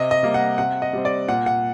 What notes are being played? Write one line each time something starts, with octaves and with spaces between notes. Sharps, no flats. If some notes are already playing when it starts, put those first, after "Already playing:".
Already playing: C3 D#5
D#5
G3 A#3
F#5
C3 F#5
D#5
G3 C4
D5
A#2 F#5
F#5